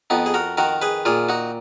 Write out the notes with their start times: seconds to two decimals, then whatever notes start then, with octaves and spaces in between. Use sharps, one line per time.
0.10 F2 B3 D#4
0.26 G#4
0.34 F#4 A#4
0.57 D#3 F#4 A#4
0.82 G#4 B4
1.05 A#2 F4 G#4
1.29 D#4 F#4